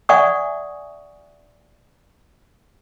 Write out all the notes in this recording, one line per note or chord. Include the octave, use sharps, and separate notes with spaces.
D5 E5 F#5 G#5 C#6 D#6